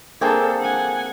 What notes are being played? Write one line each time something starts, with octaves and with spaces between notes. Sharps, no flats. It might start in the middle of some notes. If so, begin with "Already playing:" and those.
A#3 C4 D4 G#4 A4
F#5 G#5